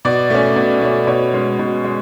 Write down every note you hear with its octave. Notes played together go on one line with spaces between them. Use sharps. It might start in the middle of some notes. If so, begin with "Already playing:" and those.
B2 D5
A3 C#4
B2
A3 C#4
B2 C#5
G#3 C#4
B2
G#3